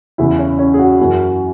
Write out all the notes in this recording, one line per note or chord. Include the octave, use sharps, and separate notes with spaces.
E2 C#3 E3 E4
C#4
C#4
G#4
F#4
F#2 E3